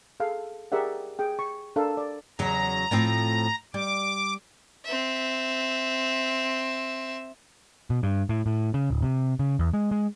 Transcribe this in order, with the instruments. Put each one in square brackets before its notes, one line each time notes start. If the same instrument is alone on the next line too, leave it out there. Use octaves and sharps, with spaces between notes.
[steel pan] G#4 A4 F5
G4 G#4 A#4 D5 E5 F#5
G#4 G5
C#6
D4 A4 A#4 F5
D5
[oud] E2 C#3 F#3 [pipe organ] A#5
[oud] A2 F3 C4
[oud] G3 [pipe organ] D6
[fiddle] C4 E5
[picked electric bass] B2
G2
A2
A2
C#3
D1
C3
C#3
E2
G#3
G#3